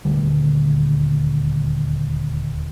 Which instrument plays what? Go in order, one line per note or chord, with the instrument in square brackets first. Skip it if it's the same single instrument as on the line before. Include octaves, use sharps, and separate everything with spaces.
[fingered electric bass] D#1 D2 D3 G3